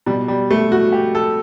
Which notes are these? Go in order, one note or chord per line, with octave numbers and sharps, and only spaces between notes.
B2 G3
G3
A3
F#4
G4
A4